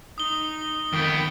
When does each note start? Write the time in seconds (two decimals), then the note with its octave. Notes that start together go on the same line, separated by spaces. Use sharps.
0.18 D#4 D#6 G7
0.93 F2 D#3 B3 G5